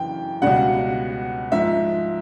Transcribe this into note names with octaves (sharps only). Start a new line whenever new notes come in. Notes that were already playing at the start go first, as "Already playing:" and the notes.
Already playing: F#2 C#3 E3 G5
C#2 B2 G3 F#5
G#2 F3 E5